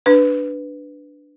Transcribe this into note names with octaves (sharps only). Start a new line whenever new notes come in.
D4 B4